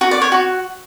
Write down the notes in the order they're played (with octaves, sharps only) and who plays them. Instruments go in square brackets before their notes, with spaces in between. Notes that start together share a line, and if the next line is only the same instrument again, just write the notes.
[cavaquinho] F#4
D5
C#5
F#4